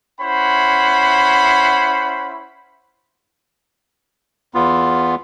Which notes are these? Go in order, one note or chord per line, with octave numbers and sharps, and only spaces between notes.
C#4 E4 C5 F#5 B5
E2 B3 F4